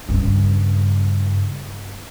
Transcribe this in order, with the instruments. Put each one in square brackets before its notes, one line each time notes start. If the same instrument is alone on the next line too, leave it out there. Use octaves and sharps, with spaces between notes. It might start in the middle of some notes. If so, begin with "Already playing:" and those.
[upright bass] G2 C#3